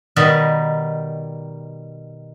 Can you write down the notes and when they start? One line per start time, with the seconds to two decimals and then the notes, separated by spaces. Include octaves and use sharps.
0.16 B2 D#3 G3 D#4